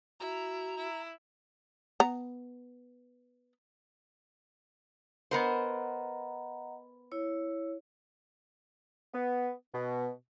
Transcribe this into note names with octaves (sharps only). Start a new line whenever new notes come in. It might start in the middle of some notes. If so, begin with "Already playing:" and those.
E4 F#4 A#5
E4
B3 A#5
B3 A#4 C5 D#5 F#5 A#5
E4 C#5
B3
B2